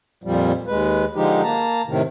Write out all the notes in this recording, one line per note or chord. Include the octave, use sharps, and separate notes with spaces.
F2 A#2 F3 G3
D#2 G#3 B4
D3 F3 G#3 D#4 G4
A#3 A5 A#5
A2 C3 D#3